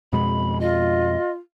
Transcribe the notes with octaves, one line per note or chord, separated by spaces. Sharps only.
F2 B2 G#3 B5
F4 D#5